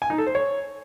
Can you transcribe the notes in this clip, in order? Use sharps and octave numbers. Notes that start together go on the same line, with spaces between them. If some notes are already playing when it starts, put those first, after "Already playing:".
G#5
D#4
A4
C5
C#5